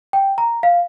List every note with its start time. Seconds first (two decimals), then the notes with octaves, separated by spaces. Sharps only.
0.13 G5
0.38 A#5
0.63 F5